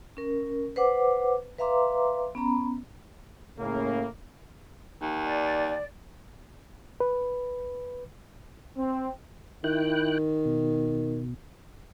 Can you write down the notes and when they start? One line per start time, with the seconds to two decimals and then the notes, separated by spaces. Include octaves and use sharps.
0.17 C#4 A#4
0.76 B4 C5 F#5 D6
1.58 B4 E5 F5 A#5 C6 D6
2.35 B3 C#4 A#5 B5
3.59 A2 C#3 A#3
5.02 D#2
5.25 D5
7.00 B4
8.77 C4
9.64 D#3 E4 G5 F#6
10.45 B2